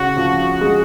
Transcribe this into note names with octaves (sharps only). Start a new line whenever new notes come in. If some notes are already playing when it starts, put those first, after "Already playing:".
Already playing: C#3 F#4
F3
G#3